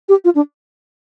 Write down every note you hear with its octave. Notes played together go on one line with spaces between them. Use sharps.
G4
F4
D4